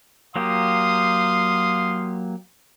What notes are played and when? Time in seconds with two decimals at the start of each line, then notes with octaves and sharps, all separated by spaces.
0.36 F#3 A#3 G4 F5 C6 D#6